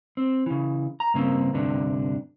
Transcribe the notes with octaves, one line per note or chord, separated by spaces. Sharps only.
C4
C#3 E3
A#5
G2 C#3 A#3 C4
D2 G2 C3 D4